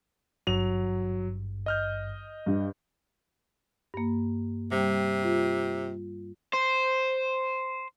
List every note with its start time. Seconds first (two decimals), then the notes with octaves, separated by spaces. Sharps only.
0.47 G#1 G2 F#3 F7
1.66 D#5 F6 G6
2.46 G2
3.94 G2 A#3
4.72 C3 G3
5.24 F4
6.53 C5